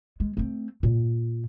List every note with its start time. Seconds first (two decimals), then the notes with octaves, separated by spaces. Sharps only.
0.20 G#3
0.37 A3 C4
0.83 A#2